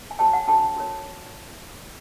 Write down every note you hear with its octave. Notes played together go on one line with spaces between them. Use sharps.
G#5
F#4 A#4 C#5 G5 A5
F#5 G#5
D4 F#4 A4 C#5 G5 A5
F#4 A#4 C#5